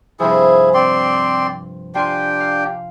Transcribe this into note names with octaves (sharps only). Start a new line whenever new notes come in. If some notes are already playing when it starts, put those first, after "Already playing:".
G2 C3 F3 E4 G#4
C4 D5 C6
D4 F4 G4 G5 G#5 C6
F5